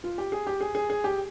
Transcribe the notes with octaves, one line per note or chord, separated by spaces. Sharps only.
F4
G4
G#4
G4
G#4
G#4
G#4
G4